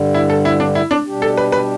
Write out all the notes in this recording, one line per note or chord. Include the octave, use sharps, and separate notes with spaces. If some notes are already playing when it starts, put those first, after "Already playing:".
Already playing: G2 D3 G3
E4
A4
E4
D4
E4
D4
B2 G3 D4 G4
A4
B4
B4